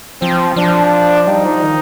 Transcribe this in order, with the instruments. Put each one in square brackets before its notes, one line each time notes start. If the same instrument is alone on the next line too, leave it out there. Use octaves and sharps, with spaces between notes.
[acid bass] F3 [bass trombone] C4
[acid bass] F3 [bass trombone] D4
[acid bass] G3 [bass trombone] D#4
[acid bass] F3
D#3